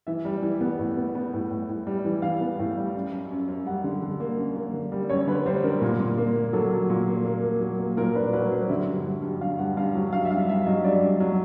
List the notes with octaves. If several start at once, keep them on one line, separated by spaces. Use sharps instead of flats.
E3 E5
G3
E3
B3
A2
B3
B3
A2
A2
A2
G3
E3
E3 F5
B3
A2
G3
F#2
F#2
F#2
F#2
G3 F#5
D3
D3
A#3
F#2
A#3
D3
G3
F#2 C#5
D3 B4
G3 C5
D3 A#4
A#2
A#2
A#3
A#3
F#3 A4
F#3
A#2
A#3
A#3
A#3
F#3
A#3
A#2 A#4
D4 B4
F#3 B4
F#3 C5
D3 E5
G2
F#3
G2
G2 F5
G2 F#5
G2 F5
F#3
G2 F5
E5
G2 F5
G2 E5
F#3 D#5
G2 D5
G2
F#3